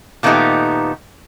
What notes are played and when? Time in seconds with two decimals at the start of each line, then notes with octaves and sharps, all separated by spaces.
0.23 A#2 D#3 A3 B3 D#4 G4